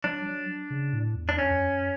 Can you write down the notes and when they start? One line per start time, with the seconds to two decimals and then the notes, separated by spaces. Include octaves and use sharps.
0.04 F#3 D4
0.26 F#3
0.70 C#3
0.93 A2
1.16 E2
1.29 D4
1.38 F2 C#4
1.51 F2
1.60 F#2